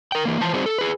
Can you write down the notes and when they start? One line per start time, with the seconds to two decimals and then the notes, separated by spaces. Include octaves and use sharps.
0.12 A#4 G5
0.25 E3 A#3
0.41 E3 F3 C5 A5
0.54 G3 C4 D#4 F#4 G#4 C5
0.66 A4
0.79 G#4 B4